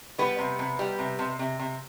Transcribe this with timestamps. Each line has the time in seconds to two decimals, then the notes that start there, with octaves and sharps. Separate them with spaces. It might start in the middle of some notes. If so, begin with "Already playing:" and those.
0.18 G3 B3 B4
0.39 C3
0.59 C3
0.79 G3
0.99 C3
1.19 C3
1.39 C3
1.59 C3